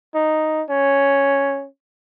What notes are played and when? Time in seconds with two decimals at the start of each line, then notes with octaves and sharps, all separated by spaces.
0.15 D#4
0.70 C#4